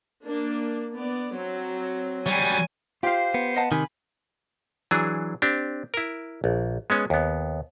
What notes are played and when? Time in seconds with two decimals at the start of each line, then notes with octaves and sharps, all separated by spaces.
0.25 A#3 D4
0.94 B3 D5
1.37 F#3 C4
2.26 F#3 G3 G#5
3.03 F4 G4 C5 F5
3.34 B3
3.56 D#5 F#5 A5
3.72 C3 D#3 G#5 B5
4.91 E3 F#3 D4 G#4
5.42 C4 D4 G4
5.94 E4 A#4
6.44 A#1
6.90 G#3 B3 C#4
7.10 D#2 B3